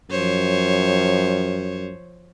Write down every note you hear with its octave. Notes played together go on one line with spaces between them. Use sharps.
F#2 F3 C5 C#5